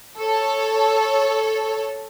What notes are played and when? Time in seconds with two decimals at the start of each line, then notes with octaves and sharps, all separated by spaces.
0.18 A4 C#5